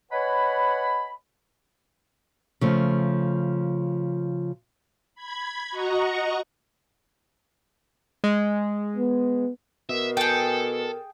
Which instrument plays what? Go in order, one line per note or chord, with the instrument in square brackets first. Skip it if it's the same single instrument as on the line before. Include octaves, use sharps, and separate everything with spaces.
[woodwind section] B4 C#5 D#5 F#5 G#5 B5
[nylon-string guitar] C#3 F3 A3
[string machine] B5 G#6
F#4 D#5 F#5 A#5 C#6
[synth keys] G#3
[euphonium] B3
[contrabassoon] B2 [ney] A#4 [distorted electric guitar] E5
[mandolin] G#4 G5 [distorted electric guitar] A4